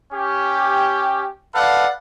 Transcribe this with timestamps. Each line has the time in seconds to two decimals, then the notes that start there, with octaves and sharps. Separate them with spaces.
0.13 C#4 G4
1.55 A4 B4 D5 F5 F#5